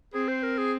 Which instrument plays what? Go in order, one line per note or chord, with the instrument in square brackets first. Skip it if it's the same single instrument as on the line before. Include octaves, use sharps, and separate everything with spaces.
[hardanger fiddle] C4 [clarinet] G#4
[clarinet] C5
A#4
G#4